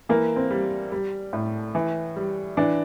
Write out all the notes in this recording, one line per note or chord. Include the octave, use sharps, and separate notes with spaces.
E3 A#3
C4
G3
G3
A2
E3
G3
E3 D4